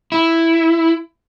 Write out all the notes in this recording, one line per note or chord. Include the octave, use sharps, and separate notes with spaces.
E4